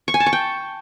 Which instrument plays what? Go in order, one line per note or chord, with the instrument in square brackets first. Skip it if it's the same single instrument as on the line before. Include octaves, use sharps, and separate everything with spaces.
[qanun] C#6
G#5
A5
C#6
G5